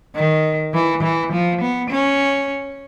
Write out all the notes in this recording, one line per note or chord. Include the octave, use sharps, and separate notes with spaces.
D#3
E3
E3
F3
B3
C#4